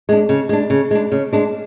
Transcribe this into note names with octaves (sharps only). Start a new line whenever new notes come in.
G#3 D4
C#3
G#3 D4
C#3
G#3 D4
C#3
G#3 D4